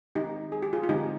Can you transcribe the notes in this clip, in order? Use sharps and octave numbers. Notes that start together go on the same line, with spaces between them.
D#3 G#3 C4 D#4 G4
G#4
G4
F4 G#4
F4
D3 G#3 C4 D#4 G4